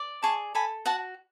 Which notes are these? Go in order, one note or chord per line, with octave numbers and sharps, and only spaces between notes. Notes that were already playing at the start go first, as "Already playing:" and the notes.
Already playing: D5
G#4 A5 C#6
A4 G#5 B5
F#4 F#5 A5